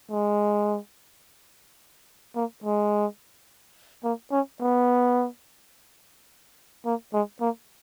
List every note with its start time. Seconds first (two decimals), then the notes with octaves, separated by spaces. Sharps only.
0.11 G#3
2.36 A#3
2.64 G#3
4.04 A#3
4.32 C#4
4.60 B3
6.86 A#3
7.13 G#3
7.41 A#3